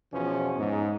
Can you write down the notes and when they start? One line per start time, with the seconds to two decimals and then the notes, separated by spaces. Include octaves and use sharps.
0.13 E2 B2 F3 C#4
0.59 G#2